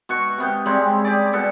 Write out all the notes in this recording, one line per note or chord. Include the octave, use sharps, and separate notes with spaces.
B2 F#4 C#6
C3 B3 G5
C#3 G3 G#3 C4
G4 G#4 D5
B2 G3 B3 A4